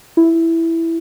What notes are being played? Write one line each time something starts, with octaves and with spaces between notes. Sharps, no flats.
E4